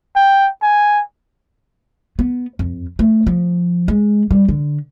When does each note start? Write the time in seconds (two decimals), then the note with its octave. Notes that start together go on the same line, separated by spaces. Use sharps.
0.16 G5
0.62 G#5
2.19 B3
2.59 F2
2.99 A3
3.27 F3
3.88 G#3
4.31 G3
4.49 D3